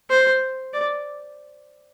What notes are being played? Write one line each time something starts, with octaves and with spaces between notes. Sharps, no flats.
C5
D5